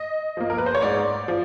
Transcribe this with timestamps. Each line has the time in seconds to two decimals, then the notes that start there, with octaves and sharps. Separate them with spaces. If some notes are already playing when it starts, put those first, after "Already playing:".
Already playing: D#5
0.37 F3 A#3
0.50 A#4
0.58 B4
0.66 C5
0.75 C#5
0.82 G#2 D5
1.28 F3